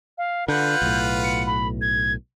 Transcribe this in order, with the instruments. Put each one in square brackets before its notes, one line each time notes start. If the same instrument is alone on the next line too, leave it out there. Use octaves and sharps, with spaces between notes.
[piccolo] F5
[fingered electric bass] D3 [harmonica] F4 B4 F#5 [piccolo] G6
[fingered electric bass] B1 A2
[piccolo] C#7
B5
G#6